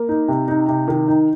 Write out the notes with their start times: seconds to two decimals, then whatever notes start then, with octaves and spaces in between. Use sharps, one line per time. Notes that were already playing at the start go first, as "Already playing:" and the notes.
Already playing: A#3
0.09 D#4
0.28 C3
0.48 D#4
0.68 C3
0.88 D#3
1.08 D#4